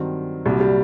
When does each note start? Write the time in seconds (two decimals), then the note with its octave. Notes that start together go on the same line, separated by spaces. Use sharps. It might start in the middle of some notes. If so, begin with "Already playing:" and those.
Already playing: G2 D#3 F#3 C4
0.46 C2 A#2 F#3 G3
0.60 G3